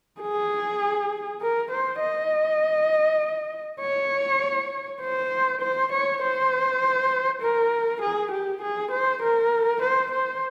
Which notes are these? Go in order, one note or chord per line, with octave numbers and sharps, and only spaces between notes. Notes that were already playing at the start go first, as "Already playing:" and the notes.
G#4
A#4
C5
D#5
C#5
C5
C5
C#5
C5
A#4
G#4
G4
G#4
C5
A#4
C5
C5